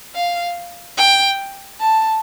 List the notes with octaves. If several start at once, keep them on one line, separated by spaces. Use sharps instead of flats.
F5
G5
A5